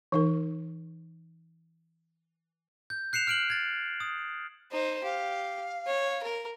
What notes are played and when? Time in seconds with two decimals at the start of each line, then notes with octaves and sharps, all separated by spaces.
0.12 E3 D#4 A#4
2.90 G6
3.13 F#6 C7 C#7 E7 F7
3.27 F6 D7 F#7
3.50 G#6 A6
4.00 D#6
4.72 D#4 C5
5.04 G4 F5
5.86 C#5
6.23 A#4